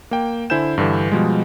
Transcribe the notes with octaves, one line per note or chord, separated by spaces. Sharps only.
A#3 G5
D3 E4 C5 G#5 G6 E7
G2 D3 E3
B2 F3 G3 G#3